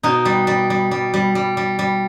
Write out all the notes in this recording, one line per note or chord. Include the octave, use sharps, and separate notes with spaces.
B2 D#4
G3
G3
G3
G3
G3
G3
G3
G3